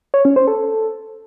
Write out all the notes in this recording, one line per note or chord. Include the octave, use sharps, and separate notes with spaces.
C#5
C#4
C5
A4